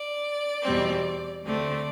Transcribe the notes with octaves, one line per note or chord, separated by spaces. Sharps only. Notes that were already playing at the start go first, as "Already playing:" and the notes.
Already playing: D5
E2 B2 G3 C4
D2 D3 A3 C4 D5